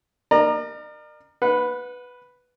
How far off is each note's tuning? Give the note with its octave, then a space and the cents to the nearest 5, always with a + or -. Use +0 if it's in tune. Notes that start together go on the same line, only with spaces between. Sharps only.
A#4 +0 D5 +45 A#5 +0
B4 +0 F#5 -30